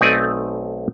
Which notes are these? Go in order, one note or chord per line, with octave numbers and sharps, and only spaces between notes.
B1 A3 C4 D#4 D5 G#5